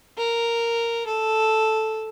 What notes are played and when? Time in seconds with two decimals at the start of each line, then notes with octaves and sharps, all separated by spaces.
0.18 A#4
1.07 A4